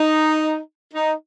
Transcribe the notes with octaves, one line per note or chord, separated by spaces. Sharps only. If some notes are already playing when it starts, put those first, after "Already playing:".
Already playing: D#4
D#4